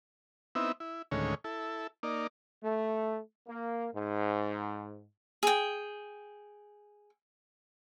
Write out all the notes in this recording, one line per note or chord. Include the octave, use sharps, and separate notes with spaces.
B3 C4 D#4 E4 E5
E4
D2 A2 D#3 G#3 C#4 C#5
E4 A4
A#3 D#4 D5
A3
A#3
G#2
G#4 G5